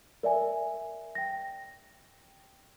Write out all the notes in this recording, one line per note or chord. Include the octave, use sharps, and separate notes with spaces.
A#4 D5 E5 G#5
G5 A#6